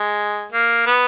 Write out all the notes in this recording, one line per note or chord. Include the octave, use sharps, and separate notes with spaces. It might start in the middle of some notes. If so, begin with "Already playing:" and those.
Already playing: G#3
A#3
B3